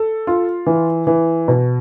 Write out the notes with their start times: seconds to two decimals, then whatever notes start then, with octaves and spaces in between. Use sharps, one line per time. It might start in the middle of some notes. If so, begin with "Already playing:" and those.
Already playing: A4
0.27 F4
0.66 E3
1.07 E3
1.48 B2